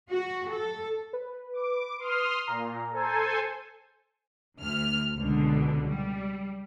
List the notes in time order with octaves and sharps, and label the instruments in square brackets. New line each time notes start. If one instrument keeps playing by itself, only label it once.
[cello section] F#4
A4
[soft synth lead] B4
[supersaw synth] D6
C6 D#6 F6
[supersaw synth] A#2 [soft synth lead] A#5
[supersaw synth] A4 C5 G#5
[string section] D2 F6
C#2 B2 D3
G3